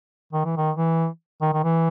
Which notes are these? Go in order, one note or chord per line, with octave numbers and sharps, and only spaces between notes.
D#3
E3
D#3
E3
D#3
D#3
E3